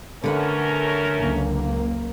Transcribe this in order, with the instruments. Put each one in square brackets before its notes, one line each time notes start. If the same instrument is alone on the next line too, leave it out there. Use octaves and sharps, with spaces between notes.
[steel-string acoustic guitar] D3 B4 F#5 [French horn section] A3 C#4 A#4
[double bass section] F#1 C#2 A#3